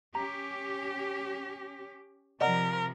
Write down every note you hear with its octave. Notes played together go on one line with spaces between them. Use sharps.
C#4 G4 A#5
C3 F3 A#4 D5 D#5 F#5